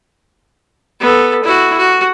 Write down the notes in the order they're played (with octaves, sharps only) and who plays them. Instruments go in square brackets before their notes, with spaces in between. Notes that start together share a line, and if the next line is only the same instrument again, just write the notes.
[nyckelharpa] B3 A4
E4 F#4
F#4